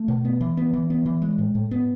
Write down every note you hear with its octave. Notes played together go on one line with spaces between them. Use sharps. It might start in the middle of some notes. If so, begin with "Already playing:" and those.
Already playing: A3
B2
B3
E3
B3
E3
B3
E3
G#3
A2
A2
B3